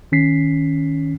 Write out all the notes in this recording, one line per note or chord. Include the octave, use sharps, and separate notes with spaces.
D#3 C#4 B6 C7